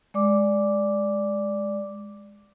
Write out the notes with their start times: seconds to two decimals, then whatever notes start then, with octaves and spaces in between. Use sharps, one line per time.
0.14 G#3 D5 D6